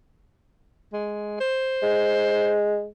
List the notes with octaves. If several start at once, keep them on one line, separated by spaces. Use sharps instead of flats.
G#3
C5
G#3